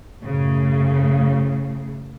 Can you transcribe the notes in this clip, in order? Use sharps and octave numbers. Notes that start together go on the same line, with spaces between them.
F#2 A2 C#3